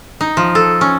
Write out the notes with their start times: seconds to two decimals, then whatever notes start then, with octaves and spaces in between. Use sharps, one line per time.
0.21 D#4
0.37 F3
0.55 A4
0.81 C#4